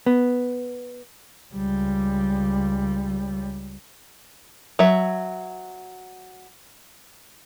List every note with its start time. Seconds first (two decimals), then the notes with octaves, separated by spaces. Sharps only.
0.06 B3
1.54 C#2 G3
4.79 F#3 E5